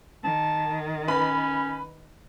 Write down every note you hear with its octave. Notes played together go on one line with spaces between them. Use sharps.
D#3 A5
C#4 B4 B5